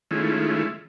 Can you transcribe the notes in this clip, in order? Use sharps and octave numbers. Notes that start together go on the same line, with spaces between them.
D#3 G#3 A3 C#4 E4 F4